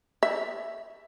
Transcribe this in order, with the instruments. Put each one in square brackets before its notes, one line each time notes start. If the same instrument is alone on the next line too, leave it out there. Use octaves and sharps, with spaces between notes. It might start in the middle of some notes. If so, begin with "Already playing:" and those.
[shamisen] E5